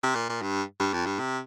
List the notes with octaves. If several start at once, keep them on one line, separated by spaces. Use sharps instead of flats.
C3
A#2
A#2
G2
G2
F2
G2
C3